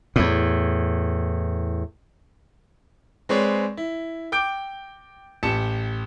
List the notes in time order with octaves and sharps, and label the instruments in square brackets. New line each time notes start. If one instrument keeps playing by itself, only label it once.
[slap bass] E2 A2
[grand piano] G#3 C4 G#4 B4 C#5 D5
E4
G5 D6 G6 D7
A1 G4 A5 C#7 E7